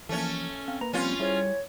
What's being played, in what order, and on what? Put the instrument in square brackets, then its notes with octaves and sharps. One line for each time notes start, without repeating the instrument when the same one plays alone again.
[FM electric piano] E3 F3 A#3 [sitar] A3 C#4 [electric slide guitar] A4 C#5
[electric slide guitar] C4 [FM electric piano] F5
[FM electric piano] A#3 B4 [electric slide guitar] A#5
[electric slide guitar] F3 G3 C4 [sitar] C#4 F4
[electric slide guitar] G3 [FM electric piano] E4 G#4 C5 [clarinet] C#5